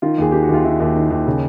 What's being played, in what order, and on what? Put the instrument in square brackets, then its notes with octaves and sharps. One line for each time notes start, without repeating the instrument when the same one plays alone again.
[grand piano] D#3 F4
D#2 G#4
D#3 G4
F#4
D#2 F4
D#3 E4
D#2
D#3
D#2
C#3